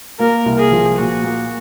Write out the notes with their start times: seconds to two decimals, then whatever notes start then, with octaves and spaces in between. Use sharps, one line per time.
0.20 A#3 A#4
0.45 C2
0.59 G#4
0.71 F3
0.98 A#2 F#4
1.24 A#3